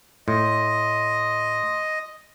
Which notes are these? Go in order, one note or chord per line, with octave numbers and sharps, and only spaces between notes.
A2 D#5 C6